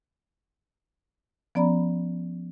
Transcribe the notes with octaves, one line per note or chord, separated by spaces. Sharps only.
F3 B3 C#4 D5 A#5 B5